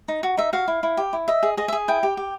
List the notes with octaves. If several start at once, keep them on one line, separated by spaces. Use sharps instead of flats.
D#4
F#4
D#4 E5
F#4 F5
E4
E4
G4
E4
D#5 E5
G#4
G#4 D#5
E5
G#4
E4 G5
G4
G4